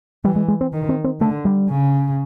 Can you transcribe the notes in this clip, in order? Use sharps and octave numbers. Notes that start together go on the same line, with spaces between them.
E3 G3
G#3
G#3
C4
D#3
C4
C4
D3 A3
G3
C#3